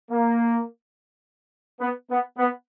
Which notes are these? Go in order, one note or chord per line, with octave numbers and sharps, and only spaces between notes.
A#3
B3
B3
B3